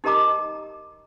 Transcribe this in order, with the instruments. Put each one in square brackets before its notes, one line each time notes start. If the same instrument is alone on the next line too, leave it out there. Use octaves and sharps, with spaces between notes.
[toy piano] D#4 G4 A#4 D#5 A#5 D6